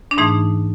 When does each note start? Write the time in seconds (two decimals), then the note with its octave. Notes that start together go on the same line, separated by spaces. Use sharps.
0.11 D4
0.18 G#2 E3 A3 D#4